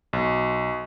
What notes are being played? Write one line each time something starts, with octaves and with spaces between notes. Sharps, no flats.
B1